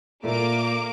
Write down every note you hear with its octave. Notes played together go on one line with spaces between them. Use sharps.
A#2 A3 A#3 D6 D7